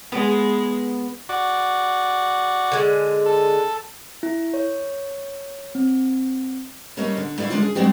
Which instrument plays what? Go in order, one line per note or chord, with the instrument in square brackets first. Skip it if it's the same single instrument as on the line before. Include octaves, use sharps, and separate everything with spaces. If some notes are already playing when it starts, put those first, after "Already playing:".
[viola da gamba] G#3 [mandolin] B3
[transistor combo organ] F#4 D5
[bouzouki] D3 G#3
[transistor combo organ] A4
[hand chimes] E4
C#5
C4
[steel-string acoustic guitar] G3 A3 A#3 C#4 C#5 D#5
D3
A3 E4 D5 F5
D3 G#3 C#4 D4 F4
G#4
F#3 G#3 C4 D4 F#4 G4